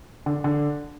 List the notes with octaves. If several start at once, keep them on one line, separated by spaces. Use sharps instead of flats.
D3
D3